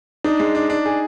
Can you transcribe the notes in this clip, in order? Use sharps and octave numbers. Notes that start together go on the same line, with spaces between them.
D4 D#4
G#3
D4
D4
G#4